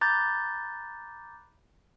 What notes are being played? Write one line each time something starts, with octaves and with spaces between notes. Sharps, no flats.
A#5 B5 D6 F#6 G6 A6